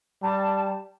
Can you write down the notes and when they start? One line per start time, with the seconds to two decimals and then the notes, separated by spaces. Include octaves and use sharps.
0.23 G3 A5